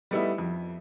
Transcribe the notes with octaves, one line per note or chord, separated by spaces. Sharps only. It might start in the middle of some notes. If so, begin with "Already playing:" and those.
G3 A3 B3 D#4 E4 E5
F2